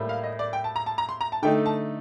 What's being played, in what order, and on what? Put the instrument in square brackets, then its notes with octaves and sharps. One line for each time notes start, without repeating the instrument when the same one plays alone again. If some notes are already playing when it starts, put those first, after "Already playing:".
Already playing: [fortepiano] A2 G3 A#3
[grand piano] F5
D#5
D5
G5
A5
A#5
A5
A#5
C6
A#5
A5
[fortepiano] D3 A3 D#4 [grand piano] G5
[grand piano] A5